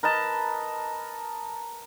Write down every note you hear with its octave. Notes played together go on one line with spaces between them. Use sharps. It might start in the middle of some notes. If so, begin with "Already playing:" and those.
A#4 B4 D#5 A5